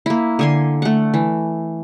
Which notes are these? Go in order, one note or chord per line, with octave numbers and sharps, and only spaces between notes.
A#3 E4
D3 G#5 C6
A3 F#5
E3